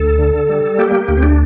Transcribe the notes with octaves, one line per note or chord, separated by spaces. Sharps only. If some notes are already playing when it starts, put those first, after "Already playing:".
Already playing: D2 A4
D3
G3
A#3 G4
D2
C4
D4